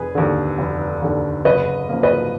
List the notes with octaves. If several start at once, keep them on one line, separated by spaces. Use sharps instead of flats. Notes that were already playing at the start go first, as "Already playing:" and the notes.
Already playing: F1 G#4 B4
D#2 D3
F1
D#2 D3
F#1 B4 D#5
F#2 F3 A#3
B4 D#5